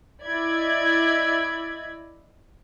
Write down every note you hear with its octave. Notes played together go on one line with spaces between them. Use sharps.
E4 D5 D#5 B5 G#6